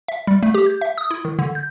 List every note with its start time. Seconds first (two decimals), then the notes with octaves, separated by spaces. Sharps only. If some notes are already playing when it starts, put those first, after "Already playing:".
0.08 E5
0.27 G3
0.43 A3
0.54 G4
0.66 G6
0.81 E5
0.98 D#6
1.11 E4
1.25 D#3
1.39 D3
1.55 G6